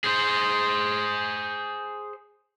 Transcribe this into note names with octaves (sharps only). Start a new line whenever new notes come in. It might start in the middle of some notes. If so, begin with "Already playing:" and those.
G#4 C5